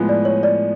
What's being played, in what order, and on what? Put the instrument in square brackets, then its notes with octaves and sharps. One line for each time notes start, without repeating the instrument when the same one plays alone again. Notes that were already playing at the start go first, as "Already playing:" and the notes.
Already playing: [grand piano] A2 F3 G#3 B3
[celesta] D5
C#5
D5